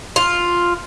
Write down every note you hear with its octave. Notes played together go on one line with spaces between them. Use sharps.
F4